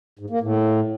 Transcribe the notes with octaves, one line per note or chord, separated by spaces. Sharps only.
G#2
A#3
A2